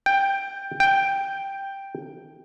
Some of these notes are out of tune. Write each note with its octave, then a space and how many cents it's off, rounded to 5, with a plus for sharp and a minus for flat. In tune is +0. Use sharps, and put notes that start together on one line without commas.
G5 +10
G5 +5